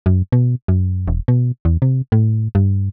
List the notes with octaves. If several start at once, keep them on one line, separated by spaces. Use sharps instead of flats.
F#2
B2
F#2
E1
B2
E2
C3
A2
G2